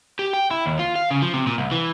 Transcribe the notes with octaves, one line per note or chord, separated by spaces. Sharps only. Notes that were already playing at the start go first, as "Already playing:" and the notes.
G4
G5
E4
D#2
F4
F5
C#3
F3
C3
A#2
C2
E3